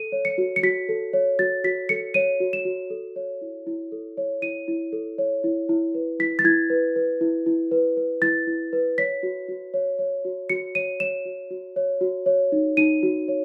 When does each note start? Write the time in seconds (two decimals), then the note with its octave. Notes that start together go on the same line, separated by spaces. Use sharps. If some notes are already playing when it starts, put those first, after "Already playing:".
Already playing: A4 D#7
0.12 C#5
0.25 C#7
0.38 F#4
0.56 C#7
0.63 F#4 B6
0.89 A4
1.13 C#5
1.39 F#4 A6
1.64 F#4 B6
1.89 A4 C#7
2.14 C#5 D#7
2.40 F#4
2.53 E7
2.65 F#4
2.90 A4
3.16 C#5
3.41 E4
3.67 E4
3.92 A4
4.17 C#5
4.42 E4 D#7
4.68 E4
4.92 A4
5.18 C#5
5.44 E4
5.69 E4
5.94 B4
6.19 E4 B6
6.39 A6
6.44 E4 G#6
6.70 B4
6.96 B4
7.21 E4
7.46 E4
7.71 B4
7.97 B4
8.22 E4 A6
8.47 E4
8.73 B4
8.98 C#5 B6
9.23 F#4
9.48 F#4
9.74 C#5
9.99 C#5
10.25 F#4
10.49 F#4 C#7
10.75 C#5 D#7
11.00 C#5 E7
11.26 F#4
11.51 F#4
11.76 C#5
12.01 F#4
12.26 C#5
12.52 D#4
12.77 D#4 D#7
13.03 F#4
13.28 C#5